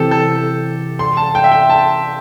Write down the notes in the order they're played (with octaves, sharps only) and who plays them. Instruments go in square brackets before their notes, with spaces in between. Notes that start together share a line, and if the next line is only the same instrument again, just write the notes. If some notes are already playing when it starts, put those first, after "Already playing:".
Already playing: [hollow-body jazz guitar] C3 E3 C4 [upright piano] G4 A4
[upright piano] A4
C6
A5
G5
E5
G5
A5